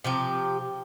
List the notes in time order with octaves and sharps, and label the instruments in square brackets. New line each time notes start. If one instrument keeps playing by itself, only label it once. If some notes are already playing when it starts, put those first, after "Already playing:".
[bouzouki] C3 F3 G4